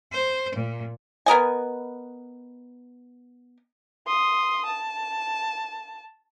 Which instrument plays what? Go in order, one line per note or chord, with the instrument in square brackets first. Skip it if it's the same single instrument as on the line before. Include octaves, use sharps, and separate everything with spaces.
[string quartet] C5
A#2
[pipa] B3 A#4 D#5 G#5
[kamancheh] C6 D#6
A5